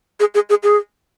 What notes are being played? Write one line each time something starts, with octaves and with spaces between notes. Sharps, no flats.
G#4
G#4
G#4
G#4